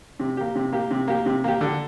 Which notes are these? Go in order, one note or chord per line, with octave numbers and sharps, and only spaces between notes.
C3
A#3 G4
C3
A#3 G4
C3
A#3 G4
C3
A#3 G4
D3